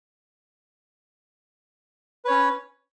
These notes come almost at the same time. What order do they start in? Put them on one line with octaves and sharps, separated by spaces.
B4 C#5 C#4